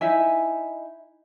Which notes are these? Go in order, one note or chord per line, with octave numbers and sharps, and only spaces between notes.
D#4 E4 E5 G#5